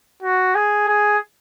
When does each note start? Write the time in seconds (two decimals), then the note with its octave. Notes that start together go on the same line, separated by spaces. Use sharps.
0.22 F#4
0.55 G#4
0.88 G#4